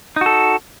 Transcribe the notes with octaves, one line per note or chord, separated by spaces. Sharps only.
D#4 F#4 A4